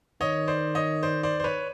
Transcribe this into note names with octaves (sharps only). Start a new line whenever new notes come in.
D#3 C#5 D#5
C5 D5
C#5 D#5
C5 D5
C5 D5
C5
B4 C#5